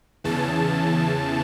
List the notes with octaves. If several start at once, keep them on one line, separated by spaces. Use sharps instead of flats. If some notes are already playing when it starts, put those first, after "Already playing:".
E2 C#3 E3 A5